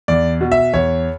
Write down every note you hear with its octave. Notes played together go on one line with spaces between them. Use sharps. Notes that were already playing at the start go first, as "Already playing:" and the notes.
E2 D5
B2
E5
E2 C#5